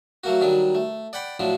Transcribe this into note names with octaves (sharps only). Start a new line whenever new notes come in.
F#3 A3 A#3 F#4
D#3 F#3 G3 D4
A3
D5 F#5 G5 B5
A2 F3 F#3 D4